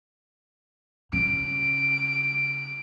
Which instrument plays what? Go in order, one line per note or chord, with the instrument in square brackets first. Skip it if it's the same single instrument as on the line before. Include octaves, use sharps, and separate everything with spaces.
[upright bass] C#3 [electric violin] D7